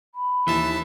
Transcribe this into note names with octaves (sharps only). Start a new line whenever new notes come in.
B5
D#2 E3 E5 A5